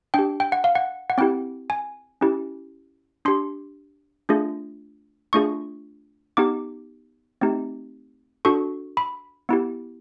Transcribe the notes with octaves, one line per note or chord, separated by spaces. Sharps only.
D4 G4 G5
G5
F#5
F5
F#5
F#5
C4 E4 G4 G5
G#5
C#4 E4 G4
D4 G4 C6
A3 D4 F4 G#4
A3 D4 F4 G#4 C#6
B3 D#4 G4 D6
A3 C4 D#4 G4
D4 F#4 A4 C#6
B5
B3 E4 G4